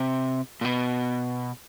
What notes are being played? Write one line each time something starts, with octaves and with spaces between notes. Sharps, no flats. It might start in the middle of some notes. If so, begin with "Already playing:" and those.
Already playing: C3
A#2
B2